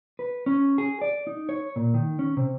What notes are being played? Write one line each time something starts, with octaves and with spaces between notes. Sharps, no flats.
B4
C#4
G#4
D5
D#4
C#5
A#2
D#3
C#4
C3